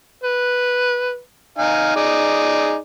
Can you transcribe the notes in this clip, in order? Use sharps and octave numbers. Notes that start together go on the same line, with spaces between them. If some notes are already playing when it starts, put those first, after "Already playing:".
B4
D#4 F5 G#5
D#4 G#4 D5